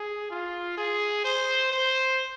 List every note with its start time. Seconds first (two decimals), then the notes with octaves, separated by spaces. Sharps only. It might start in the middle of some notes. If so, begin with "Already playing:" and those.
Already playing: G#4
0.31 F4
0.77 G#4
1.24 C5
1.72 C5